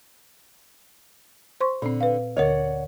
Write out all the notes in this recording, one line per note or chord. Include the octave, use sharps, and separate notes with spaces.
C5 C6 C#6
A#2 D3 C4
B4 F5
D2 D3 A#4 C#5 D5 F#5